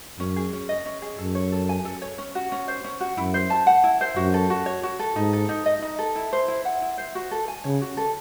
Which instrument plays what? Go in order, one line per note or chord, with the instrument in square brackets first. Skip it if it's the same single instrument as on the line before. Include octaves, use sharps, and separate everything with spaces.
[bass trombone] F#2 [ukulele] C#4
[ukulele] G#4
C#4
D#5
C#4
G#4
[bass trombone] F#2 [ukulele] A4
[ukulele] C#5
A4
G#5
A4
C#5
C#4
F#4
C#4
C5
C#4
F#4
[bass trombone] F#2 [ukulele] E4
[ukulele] C5
A5
F#5
E4
C5
[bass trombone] F#2 [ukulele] F#4
[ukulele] A4
F#4
C#5
F#4
A4
[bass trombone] G#2 [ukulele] D#4
[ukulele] A4
D#4
D#5
D#4
A4
E4
C5
E4
F#5
E4
C5
F#4
A4
G#5
[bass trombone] C#3 [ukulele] C#5
[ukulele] F#4
A4